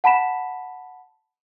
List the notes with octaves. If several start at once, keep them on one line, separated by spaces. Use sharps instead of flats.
F#5 A5 B5 B6 E7